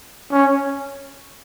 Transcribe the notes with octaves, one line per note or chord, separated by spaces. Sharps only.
C#4